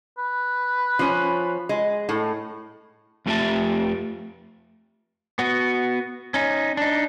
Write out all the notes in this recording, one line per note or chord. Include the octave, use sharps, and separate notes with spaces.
B4
F3 C#4
G#3
A2
F2 A3 F4 G4 E5 A5
B3 F#4
C#4 D#4
D4 D#4